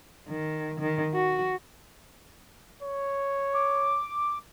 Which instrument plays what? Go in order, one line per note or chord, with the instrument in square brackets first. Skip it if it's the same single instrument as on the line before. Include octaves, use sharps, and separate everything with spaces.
[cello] D#3
D#3
F#4
[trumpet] C#5
[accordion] D6